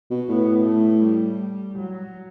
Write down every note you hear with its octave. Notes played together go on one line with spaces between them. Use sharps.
B2
A2 B3
A3
G3
F#3